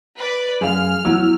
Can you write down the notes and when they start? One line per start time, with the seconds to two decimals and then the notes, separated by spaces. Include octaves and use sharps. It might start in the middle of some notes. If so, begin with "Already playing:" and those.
0.18 B4 D5
0.61 F#2 G#4 F5 F6
1.05 E2 F#3 E6